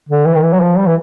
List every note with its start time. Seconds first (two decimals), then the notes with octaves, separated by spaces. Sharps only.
0.09 D3
0.26 E3
0.35 D#3
0.43 E3
0.53 F#3
0.61 F3
0.78 G3
0.87 E3